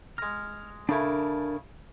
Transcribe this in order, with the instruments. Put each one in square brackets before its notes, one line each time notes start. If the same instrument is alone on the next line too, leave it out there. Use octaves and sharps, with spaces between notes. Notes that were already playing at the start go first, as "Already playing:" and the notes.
[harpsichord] G#3 A#5 [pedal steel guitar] F6
[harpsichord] C#3 A3 E4 [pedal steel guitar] D4 A#4